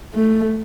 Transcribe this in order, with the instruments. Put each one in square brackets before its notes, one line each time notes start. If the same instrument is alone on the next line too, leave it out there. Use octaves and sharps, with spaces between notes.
[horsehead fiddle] A3